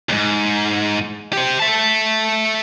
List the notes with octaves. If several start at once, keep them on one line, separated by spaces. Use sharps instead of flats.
D#2 G#2
G4 C5
E5 A5